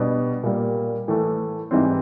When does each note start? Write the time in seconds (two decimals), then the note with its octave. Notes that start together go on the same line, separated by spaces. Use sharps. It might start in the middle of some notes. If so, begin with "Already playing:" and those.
Already playing: B2 G3 B3 D4
0.43 A#2 G3 A#3
1.08 A2 E3 A3
1.71 G#2 E3 G3 C4